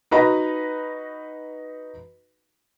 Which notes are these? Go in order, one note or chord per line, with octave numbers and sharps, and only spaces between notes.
D#4 F#4 B4 D#5 A#5 B5